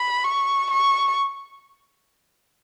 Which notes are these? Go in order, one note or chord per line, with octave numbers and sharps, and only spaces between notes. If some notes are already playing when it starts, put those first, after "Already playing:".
Already playing: B5
C#6
C#6